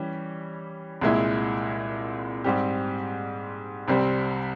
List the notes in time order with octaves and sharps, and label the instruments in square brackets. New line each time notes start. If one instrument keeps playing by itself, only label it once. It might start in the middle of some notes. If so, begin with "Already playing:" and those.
Already playing: [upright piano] E3 G3 C#4 G4
C2 A#2 G#3 E4
G#2 G3 C4 G4
C2 C3 G3 C4